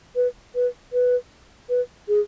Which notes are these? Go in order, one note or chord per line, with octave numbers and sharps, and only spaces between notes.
B4
B4
B4
B4
G#4